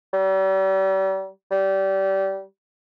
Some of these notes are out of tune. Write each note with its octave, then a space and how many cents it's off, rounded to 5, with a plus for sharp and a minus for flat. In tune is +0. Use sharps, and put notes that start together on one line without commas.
G3 -40
G3 -25